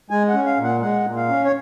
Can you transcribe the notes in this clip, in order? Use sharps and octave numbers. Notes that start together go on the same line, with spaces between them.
G#3 G#5
F#5
C#4
F5
A#2
F#5
G#3 F#5
A#2
F5
C#4
C#5